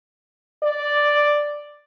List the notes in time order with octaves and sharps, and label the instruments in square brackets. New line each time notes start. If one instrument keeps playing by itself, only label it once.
[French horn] D5